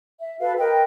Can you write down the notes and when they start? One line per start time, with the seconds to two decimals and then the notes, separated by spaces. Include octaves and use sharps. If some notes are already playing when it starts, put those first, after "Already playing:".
0.21 E5
0.40 F#4 A4 B4 F5
0.57 A#4 B4 D#5 G5